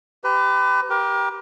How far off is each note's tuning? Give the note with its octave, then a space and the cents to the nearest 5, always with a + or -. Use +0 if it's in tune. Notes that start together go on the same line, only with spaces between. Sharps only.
G4 +0 B4 +35 A#5 +10
G4 +0 A#4 +35